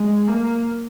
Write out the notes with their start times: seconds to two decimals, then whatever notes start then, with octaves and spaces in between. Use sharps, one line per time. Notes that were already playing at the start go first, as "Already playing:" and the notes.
Already playing: G#3
0.28 A#3